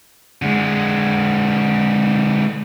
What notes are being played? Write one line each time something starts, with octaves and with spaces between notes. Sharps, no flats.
D3 G#3